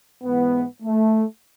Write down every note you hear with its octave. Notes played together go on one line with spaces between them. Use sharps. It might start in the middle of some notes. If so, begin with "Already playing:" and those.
G#2 E3 B3
A3